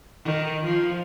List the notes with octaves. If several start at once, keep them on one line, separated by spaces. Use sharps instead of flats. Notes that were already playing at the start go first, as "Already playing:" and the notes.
D#3
F3